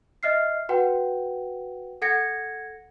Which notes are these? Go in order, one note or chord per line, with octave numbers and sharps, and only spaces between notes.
D#5 E5 F6 C7
F#4 B4 F#5 G5
A4 F#5 G#6 A#6 C#7